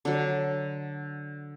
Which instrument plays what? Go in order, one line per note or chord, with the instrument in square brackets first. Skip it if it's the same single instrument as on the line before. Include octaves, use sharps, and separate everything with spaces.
[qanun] D3 F#3